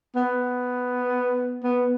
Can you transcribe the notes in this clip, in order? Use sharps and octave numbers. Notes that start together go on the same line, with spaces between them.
B3
B3